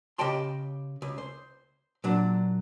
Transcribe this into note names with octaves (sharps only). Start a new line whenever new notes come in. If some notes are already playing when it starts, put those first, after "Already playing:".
C#3 G4 D#5 G5 A5 C6
C#2
C5
A#2 F#3 D4